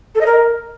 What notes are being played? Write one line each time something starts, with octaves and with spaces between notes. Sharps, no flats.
A4
D#5
A#4